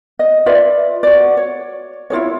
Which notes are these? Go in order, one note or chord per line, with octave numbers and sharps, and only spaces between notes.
D#5
F4 B4 D5 E5
F#4 D5
C#5
E4 F4 G#4 C#5